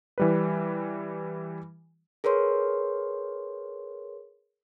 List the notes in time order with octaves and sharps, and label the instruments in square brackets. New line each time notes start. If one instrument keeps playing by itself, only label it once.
[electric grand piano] E3 G3 B4
[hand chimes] G#4 A#4 B4 C#5 C6